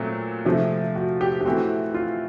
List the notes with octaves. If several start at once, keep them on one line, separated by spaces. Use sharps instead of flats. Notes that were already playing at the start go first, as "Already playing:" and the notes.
Already playing: A#2 F#3 A3 C4
C3 F3 A3
F#4
G4
G4
E3 A3 C4 F#4
F4